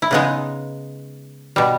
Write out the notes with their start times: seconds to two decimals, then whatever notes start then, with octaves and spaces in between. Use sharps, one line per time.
0.02 E4
0.11 C#3 G#3 B3 D#4
1.56 B2 G3